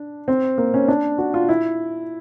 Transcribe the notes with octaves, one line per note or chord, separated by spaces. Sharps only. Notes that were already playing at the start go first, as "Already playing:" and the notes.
Already playing: D4
C4
A#3
C#4
D4
F#4
F4
E4